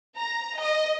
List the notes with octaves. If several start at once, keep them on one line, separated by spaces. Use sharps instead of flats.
A#5
D#5